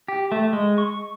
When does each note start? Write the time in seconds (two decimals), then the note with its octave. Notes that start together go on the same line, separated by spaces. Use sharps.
0.08 G4
0.32 A3
0.53 G#3
0.78 C#6